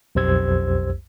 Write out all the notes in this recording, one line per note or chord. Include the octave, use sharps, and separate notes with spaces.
B1 F2 G4 C5 E6 G#6